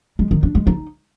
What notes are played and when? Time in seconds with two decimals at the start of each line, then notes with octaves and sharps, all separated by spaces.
0.19 G#3
0.31 D#3
0.43 D4
0.55 G#3
0.67 D#4